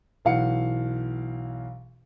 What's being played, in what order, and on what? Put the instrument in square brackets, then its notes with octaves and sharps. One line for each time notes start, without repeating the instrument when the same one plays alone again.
[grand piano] B1 E3 F5 F#5 C#7